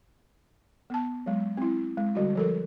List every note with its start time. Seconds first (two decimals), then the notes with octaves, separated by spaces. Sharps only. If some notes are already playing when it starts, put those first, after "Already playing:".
0.90 B3 A5
1.26 F#3 G#3
1.57 C4 E4
1.97 G#3
2.15 D3 G3 F#4
2.35 F3 A4 A#4